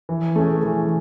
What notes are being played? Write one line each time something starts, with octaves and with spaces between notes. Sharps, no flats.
E3
A3 C#4 G#4
E3